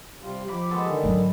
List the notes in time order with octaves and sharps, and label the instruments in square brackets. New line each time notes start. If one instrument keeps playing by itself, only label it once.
[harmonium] C3 G3 F4
[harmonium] F3 G4 [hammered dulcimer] B5 D6
[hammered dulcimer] G#3 B3 A4
[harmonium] D3 D#3
[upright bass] G#2 F#3